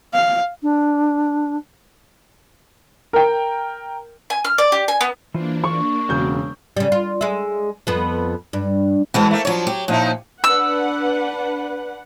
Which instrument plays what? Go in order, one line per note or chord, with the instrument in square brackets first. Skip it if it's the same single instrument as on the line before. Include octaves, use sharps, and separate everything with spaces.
[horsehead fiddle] F5
[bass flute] D4
[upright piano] A#4 G5
[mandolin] G#5
F6
D5
G4
G#5
B3
[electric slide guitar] E3 F4 C5 [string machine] A#3 D4
[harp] C#6
[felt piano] E1 C#3 G6 [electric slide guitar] F#4
[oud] C#3 G3
F4
G#3 E5
F2 B3
G2
[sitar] B2 C4 [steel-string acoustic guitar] E3 G#3 B3
[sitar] A3 A#3
[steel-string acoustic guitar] F3 D4 [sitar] F#3 C#5
[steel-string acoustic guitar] G4
[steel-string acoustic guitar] A#2 [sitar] F3 D#4 E4
[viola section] D4 B4 F#5 [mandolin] E6